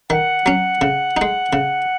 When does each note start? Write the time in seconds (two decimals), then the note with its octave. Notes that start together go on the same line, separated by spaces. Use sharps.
0.10 D#3 F#5
0.46 F#3 C#4
0.81 C#3
1.17 G#3 D#4
1.53 C#3